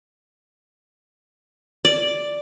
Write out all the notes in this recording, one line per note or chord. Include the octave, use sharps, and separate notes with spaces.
D5